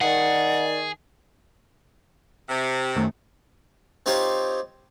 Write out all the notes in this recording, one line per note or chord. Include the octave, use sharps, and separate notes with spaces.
D#3 G#4 D5 F#5
C3
F#2 D#3 A3
C4 D#4 F4 G4 C#5 C6